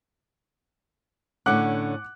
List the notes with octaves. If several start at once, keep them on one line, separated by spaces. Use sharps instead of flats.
A2 D3 C#4 F#5 D6 F#6